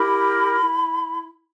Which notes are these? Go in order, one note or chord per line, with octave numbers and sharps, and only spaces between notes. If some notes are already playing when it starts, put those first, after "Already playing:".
Already playing: E4 G4 A#4 B5
E4